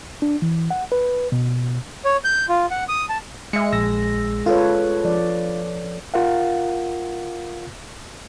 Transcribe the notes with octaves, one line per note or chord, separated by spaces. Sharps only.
D4
E3
F#5
B4
B2
C#5
G6
F4
F#5
D#6
A5
G#3 E5 C#7
A#1 E6 A#6
F4 A4 B4 C#5
F3 D5
F4 A#4 F5 F#5